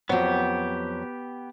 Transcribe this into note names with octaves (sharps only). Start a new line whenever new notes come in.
F2 F#3 B3 G4